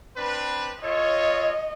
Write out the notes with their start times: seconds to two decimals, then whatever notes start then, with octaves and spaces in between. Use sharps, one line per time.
0.17 C4 D4 B4
0.84 F4 A4 C#5 D#5